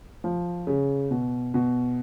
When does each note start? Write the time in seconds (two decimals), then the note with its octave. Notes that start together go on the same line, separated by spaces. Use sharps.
0.24 F3
0.67 C#3
1.11 B2
1.54 B2